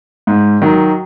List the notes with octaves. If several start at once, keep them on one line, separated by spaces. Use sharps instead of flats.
G#2
D#3 F#3